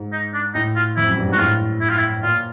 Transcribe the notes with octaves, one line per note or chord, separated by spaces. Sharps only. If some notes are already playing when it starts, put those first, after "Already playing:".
Already playing: G#2
D#4
D4
A2 D#4
F4
F2 E4
F#2
G2
G#2 F#4
A2 F4
E4
F4
E4
A#2 F4